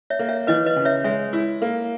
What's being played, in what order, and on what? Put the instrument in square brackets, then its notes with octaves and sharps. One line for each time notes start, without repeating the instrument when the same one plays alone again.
[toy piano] C#5 E5
[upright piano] A#3
[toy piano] C#5 E5
[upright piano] E3 [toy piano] B4 D#5
[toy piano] B4 D#5
[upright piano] C#3
[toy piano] C#5 E5
[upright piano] G#3 [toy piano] C#5 E5
[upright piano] E4
A#3